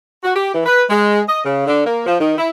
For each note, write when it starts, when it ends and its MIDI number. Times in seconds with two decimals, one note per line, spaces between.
0.23 0.34 66
0.35 0.51 67
0.54 0.62 52
0.66 0.83 71
0.90 1.21 56
1.29 1.40 75
1.45 1.65 49
1.66 1.84 50
1.86 2.03 58
2.06 2.18 53
2.20 2.33 51
2.37 2.50 64